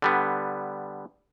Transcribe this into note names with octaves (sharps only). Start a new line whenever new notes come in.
D3 G3 B3